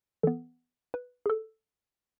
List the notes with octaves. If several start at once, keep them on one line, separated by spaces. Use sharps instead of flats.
E3 B3 A4
B4
G#4
A4